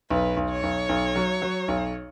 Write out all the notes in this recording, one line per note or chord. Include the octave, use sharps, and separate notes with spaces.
B1 B4
B1
C#5
B1
B1
F#3
F#3
B1